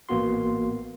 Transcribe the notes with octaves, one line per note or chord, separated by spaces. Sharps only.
A1 A#3 B3 F#4 C6